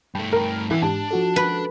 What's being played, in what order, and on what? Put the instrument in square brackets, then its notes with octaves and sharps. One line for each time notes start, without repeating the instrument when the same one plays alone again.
[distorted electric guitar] G2 A3 [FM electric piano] G5 A5 B5
[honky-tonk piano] A#4
[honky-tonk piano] E3 [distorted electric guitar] E5 F#5
[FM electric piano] G#2 G4 [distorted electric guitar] D4 [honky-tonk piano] A5
[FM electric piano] F3 F#4 A4
[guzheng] B4